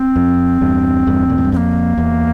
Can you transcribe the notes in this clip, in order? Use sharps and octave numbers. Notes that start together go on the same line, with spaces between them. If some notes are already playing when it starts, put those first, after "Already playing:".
Already playing: C4
F2
E2 G2
E2 G2
A#2
A2
G2
F2 A#3 C4
E2